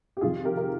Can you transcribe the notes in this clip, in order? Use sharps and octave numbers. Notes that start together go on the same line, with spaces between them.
G4
F2 C3 D#3 F4 G#4
G4 A#4
A#4